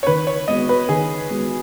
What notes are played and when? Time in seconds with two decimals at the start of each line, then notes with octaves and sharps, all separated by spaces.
0.03 C#5
0.07 D#3 B4
0.27 C#5
0.48 G#3 B3 F#4 D#5
0.69 B4
0.89 D#3 G#4
1.30 G#3 B3 F#4